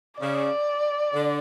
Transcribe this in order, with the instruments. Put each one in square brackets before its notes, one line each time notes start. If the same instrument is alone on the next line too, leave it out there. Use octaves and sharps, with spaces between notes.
[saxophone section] C#3 [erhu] D5
[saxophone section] D3